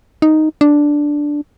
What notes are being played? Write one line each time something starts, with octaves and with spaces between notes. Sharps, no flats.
D#4
D4